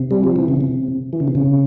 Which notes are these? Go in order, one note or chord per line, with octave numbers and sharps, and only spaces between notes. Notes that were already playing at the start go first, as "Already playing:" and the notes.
Already playing: C3
G3
F3
E3
C#3
C3
E3
C#3
C3
C#3